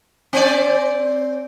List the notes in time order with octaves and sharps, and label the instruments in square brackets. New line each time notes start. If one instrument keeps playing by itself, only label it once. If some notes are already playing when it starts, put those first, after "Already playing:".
[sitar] C4 D5